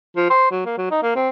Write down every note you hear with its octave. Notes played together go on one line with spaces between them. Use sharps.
F3
C5
F#3
A#3
F#3
D#4
A#3
C4